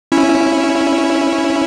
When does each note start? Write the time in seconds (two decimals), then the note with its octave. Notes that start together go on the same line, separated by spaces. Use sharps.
0.12 C#4 E4